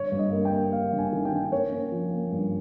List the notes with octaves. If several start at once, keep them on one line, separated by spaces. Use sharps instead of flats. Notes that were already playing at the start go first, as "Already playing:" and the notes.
Already playing: G1 C#5
G2
D#5
A#3
G5
A#3
A#3 F5
G1
G#5
D#3
G5
D#3
A#3 C#5
C#4
F3
A#3
G2